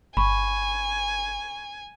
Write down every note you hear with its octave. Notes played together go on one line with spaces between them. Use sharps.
G1 G#5 B5 C#6